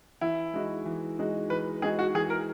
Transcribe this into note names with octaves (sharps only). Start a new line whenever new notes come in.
E3 E4
G#3 D#4 F#4
E3
G#3 D#4 F#4
E3 B4
G#3 D#4 F#4 G#4
F#4
E3 G#4
A#4